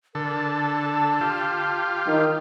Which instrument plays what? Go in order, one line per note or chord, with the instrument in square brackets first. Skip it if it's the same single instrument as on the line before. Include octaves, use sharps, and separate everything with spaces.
[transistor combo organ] D3 A4 [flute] A#4
[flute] A5
[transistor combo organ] F4 G4
[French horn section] D#3